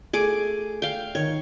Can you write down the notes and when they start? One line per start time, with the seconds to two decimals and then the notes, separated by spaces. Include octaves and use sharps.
0.13 A3 G#4 D6
0.82 F5 G5
1.15 D#3 C#5